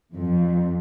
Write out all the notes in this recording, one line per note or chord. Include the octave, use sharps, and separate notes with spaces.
F2